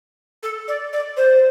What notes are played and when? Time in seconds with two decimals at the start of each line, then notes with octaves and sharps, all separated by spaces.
0.43 A4
0.68 D5
0.93 D5
1.17 C5